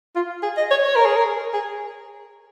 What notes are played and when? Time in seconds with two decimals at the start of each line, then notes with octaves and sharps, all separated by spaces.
0.16 F4
0.43 G#4
0.57 D#5
0.71 C#5
0.84 C#5
0.96 A#4
1.05 G#4
1.16 A#4
1.54 G#4